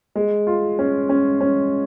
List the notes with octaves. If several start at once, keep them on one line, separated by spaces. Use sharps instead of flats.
G#3
F4
C#4
C#4
C#4